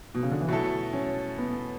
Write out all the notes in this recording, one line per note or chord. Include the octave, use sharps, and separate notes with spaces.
B2
C#3
D3
E3
B2 F#3 A3 E4 A4
C#4
B3